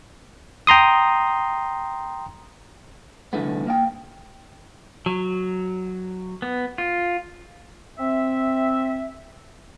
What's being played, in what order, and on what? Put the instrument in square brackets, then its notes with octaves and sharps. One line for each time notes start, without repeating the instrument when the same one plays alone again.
[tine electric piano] G5 A#5 C6 D#6
[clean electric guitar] C2 D3 E3 A3 B3
A#3 F5 G5
[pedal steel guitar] F#3
B3
F4
[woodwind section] C4 E5